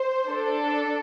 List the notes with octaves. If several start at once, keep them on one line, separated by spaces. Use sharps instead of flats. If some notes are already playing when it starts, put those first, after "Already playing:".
Already playing: C5
D4 A4